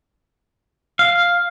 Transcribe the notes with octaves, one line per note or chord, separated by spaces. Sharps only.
F5